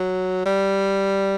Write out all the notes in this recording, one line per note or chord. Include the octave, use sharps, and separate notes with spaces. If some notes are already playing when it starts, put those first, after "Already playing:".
Already playing: F#3
G3